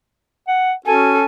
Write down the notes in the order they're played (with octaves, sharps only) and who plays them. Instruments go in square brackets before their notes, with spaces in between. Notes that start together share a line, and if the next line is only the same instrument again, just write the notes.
[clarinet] F#5
[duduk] C#4 [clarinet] F#4 [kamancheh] A4 [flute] G#5